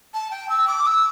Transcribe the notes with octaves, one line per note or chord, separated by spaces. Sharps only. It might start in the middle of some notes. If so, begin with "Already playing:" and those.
A5
G5
E6
D6
E6